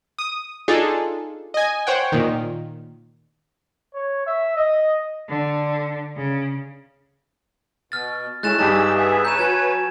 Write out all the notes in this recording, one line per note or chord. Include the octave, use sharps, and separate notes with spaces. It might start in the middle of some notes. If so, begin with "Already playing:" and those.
D#6
D4 D#4 F4 G#4 A4
D#5 G#5
C5 C#5 F#5 G5
A#2 D#3
C#5
E5
D#5
D3
C#3
B2 F6 A6
G#3 A3 C#4 E4 F#6 A6 E7
G2 G3 D#4 G4 G#4 A5 E6
B3 G#4 E5
B4 C#5 A#5 G6 E7
F#3 F#4 G#5 F#6 G#6